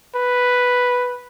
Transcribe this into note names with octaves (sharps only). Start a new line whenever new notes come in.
B4